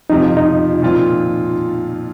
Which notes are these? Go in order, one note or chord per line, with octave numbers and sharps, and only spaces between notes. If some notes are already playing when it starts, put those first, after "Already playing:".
F2 C3 F3 D#4
F4
D#4
A#2 F3 C4 F4